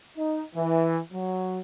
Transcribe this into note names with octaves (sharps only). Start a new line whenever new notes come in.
D#4
E3
F#3